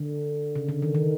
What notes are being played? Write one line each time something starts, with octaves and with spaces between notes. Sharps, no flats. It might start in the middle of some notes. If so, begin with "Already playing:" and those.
Already playing: D3
C#3
D3
D#3
D#3